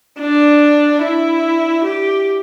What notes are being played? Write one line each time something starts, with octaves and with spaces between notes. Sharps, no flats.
D4
E4
G4